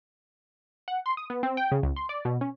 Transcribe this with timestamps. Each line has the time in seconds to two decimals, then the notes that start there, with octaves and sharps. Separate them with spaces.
0.88 F#5
1.06 C6
1.17 D#6
1.30 B3
1.43 C4
1.57 G5
1.71 C#3
1.83 C#2
1.96 C6
2.09 D5
2.25 B2
2.41 C#4